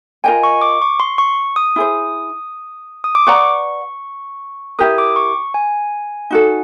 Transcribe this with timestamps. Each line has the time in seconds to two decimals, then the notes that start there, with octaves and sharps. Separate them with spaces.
0.24 F4 A#4 D#5 G5 G#5
0.43 C#6
0.62 D6
0.82 C#6
1.00 C6
1.18 C#6
1.56 D#6
1.76 E4 G#4 C5
3.04 D#6
3.15 D6
3.27 B4 D5 F#5 A#5 C#6
4.79 E4 G4 A#4 D#6
4.98 D6
5.16 C#6
5.54 G#5
6.31 D#4 F#4 A4